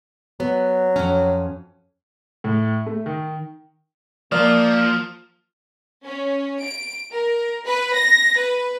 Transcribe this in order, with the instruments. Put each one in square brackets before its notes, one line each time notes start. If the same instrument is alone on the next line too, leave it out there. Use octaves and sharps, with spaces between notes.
[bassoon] F#3 [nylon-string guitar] B3
[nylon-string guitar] F2 C#4
[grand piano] A2
A3
D#3
[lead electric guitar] F3 [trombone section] A#3 [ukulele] D5 [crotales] D#6 F6
[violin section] C#4
D7
A#4
B4
A#6
B4